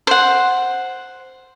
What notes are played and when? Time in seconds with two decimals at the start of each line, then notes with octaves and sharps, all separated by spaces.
0.07 C5 F#5